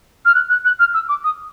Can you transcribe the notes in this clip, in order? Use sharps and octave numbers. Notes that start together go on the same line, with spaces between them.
F6
F#6
F#6
F#6
F6
E6
D6
D#6